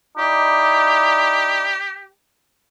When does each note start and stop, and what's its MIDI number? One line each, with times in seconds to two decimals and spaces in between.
0.18 1.76 63
0.18 1.76 64
0.18 2.08 67
0.18 1.76 74